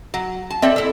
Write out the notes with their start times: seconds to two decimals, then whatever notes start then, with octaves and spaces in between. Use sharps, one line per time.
0.14 F#3
0.50 A5
0.62 C4 A4 D5 E5
0.76 E4 A4